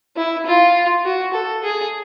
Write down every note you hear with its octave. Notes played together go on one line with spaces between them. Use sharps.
E4
F4
F#4
A4
G#4